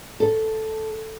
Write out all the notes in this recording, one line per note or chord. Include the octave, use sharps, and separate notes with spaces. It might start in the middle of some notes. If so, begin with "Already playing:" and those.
A4